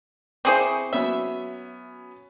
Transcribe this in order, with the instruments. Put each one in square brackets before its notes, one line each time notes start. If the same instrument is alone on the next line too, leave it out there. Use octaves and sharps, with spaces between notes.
[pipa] C4 G#4 C5 [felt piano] E4 C#6 D6
[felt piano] F#3 B3 C#4 [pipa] E5